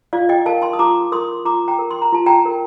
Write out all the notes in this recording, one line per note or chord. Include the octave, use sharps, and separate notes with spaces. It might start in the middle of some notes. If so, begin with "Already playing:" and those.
F4 D5 F5
D#5 G5
A#4 F5 A5
A5 C6
D#6
F4 A#5 D6
A#4 C6 D#6
F4 A#5 D6
G5 A#5
A#4
C6
A#5
F4 A5
G5 A#5
A#4